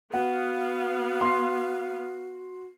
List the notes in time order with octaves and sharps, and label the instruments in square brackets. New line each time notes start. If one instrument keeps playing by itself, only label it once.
[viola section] B3 F5 [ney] F#4 [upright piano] F#5
[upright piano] C6 C7